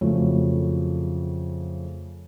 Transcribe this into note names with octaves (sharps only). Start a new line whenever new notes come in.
F2 C#3 F#3 A3 C#4